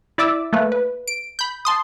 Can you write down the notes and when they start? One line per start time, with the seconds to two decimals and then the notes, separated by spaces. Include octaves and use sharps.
0.18 E4 D5 E5 D6 E6
0.53 A3 A#3 B4
0.72 B4
1.08 D7
1.39 B5 G6
1.65 A5 C6 D#6